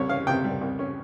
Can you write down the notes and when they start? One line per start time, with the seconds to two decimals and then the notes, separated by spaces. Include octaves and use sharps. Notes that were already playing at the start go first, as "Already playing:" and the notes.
Already playing: C2 G3 C#5
0.09 C#4 F5
0.27 C3 G5
0.44 G3
0.61 C2
0.79 C#4